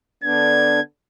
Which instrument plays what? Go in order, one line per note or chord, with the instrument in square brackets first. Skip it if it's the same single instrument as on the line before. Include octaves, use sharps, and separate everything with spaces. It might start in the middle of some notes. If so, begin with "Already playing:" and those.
[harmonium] D3 B3 D4 [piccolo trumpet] G#6